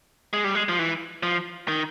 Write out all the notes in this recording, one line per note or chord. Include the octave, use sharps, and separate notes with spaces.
G#3
G3
G#3
F3
E3
F3
D#3